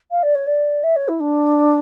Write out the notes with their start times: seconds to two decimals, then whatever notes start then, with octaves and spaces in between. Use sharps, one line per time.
0.11 F5
0.23 D5
0.35 C#5
0.47 D5
0.83 E5
0.96 C#5
1.08 E4
1.20 D4